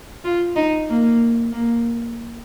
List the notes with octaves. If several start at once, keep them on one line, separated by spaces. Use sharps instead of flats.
F4
D#4
A#3
A#3